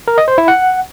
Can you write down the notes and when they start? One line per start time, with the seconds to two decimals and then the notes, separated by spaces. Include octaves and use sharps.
0.08 A#4
0.18 D#5
0.28 C5
0.38 E4
0.48 F#5